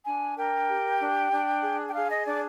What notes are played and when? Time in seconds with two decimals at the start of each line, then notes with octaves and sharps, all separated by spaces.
0.05 D4 G#5
0.36 A#4 G5
0.68 G4
1.00 D4
1.31 D4
1.62 G#4
1.87 G5
1.94 G#4 F5
2.10 D#5
2.25 D4 D5